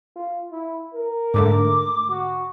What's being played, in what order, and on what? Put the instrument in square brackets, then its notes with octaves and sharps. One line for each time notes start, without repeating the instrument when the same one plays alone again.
[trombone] F4
E4
A#4
[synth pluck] G#2 D3 A3 [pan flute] D6
[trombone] F#4